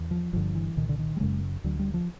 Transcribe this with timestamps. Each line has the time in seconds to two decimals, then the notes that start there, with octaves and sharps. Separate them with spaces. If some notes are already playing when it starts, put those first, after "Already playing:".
Already playing: E2
0.11 F3
0.33 G1 G2 D3 F3
0.55 E3
0.77 C2 A#2 D#3
0.89 D3
0.99 D#3
1.16 G3
1.20 F#1 F#2 C#3 G#3
1.64 D2 D3 F#3
1.79 G3
1.94 F3